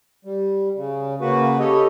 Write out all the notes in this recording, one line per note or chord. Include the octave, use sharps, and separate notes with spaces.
G3
C#3
C#3 A#3 F#4 B4
G4 A4 C#5 D#5